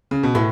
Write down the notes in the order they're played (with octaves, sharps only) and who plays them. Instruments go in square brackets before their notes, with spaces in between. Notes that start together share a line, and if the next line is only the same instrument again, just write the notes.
[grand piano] C#3
B2
[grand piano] A2 [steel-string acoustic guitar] E3 A3